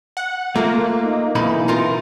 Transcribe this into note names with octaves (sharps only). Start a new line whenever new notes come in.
F#5
A3 A#3 F4
D#4
B1 E3 D#4 B5
D#4 F4 A#4